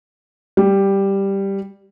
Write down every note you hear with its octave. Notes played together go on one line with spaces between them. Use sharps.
G3